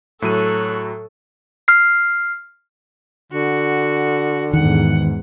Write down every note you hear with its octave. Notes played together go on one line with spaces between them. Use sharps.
A2 F#3 A4 C#5 F#6 D#7
F6 C7
D3 F#4
E2 G#2 D#3 F#5